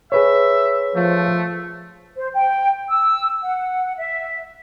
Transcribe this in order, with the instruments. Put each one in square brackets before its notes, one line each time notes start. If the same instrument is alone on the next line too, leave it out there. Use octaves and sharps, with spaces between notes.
[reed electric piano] G#4 B4 C#5 [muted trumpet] E5
[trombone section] F3 [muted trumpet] A3
[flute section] C5
G5
E6
F#5
E5